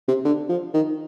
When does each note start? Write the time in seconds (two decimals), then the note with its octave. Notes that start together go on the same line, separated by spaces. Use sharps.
0.08 C3
0.25 D3
0.49 F3
0.74 D#3